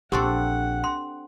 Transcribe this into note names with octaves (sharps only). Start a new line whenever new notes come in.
A#1 C4 D4 G4 A4 F#5 C6 C#6
C6